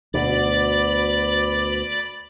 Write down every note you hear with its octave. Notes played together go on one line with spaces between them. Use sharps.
D2 B2 D5 B5 D6